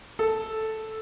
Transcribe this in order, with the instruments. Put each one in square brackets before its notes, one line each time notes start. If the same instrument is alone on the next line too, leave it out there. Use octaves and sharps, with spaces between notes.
[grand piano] A4